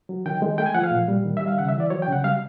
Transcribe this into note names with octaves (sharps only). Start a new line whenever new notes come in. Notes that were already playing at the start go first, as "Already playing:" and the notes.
F#3
D#3 G5
G#3
A3 G5
G#5
F3 F#5
F5
A#2
G3
D#3
G3 E5
F5
C#3 F#5
E5
E3
D5
F#3 C#5
G5
C#3 F#5
G3 F5